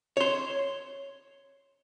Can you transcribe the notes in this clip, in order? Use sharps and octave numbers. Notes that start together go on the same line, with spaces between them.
C#5 C6